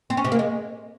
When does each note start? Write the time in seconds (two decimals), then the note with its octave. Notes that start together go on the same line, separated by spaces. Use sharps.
0.10 C4
0.17 C#4
0.25 C3
0.32 A#3
0.39 G#3